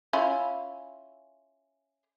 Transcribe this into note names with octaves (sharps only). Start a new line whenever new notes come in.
C#4 E4 F4